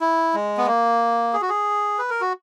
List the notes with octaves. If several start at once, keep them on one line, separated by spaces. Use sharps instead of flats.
E4
G#3
B3
A#3
G#4
F#4
G#4
B4
A#4
F#4